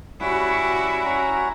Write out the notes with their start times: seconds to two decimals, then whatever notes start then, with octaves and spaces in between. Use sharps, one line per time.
0.21 G3 C#4 E4 F#4 F#5
1.05 C#4 F#5 A#5